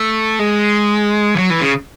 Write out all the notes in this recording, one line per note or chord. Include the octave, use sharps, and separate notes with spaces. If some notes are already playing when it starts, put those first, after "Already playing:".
Already playing: A3
G#3
E3
F#3
E3
C#3